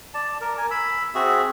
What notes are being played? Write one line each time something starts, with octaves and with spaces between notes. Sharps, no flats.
D5 A5
A#4
A#4 G#5
B5 E6
C4 F#4 G#4 E5